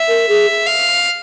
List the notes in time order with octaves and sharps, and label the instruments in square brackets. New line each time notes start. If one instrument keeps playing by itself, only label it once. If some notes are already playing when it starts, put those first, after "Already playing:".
Already playing: [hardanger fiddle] E5
[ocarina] A#4
G#4
[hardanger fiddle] F5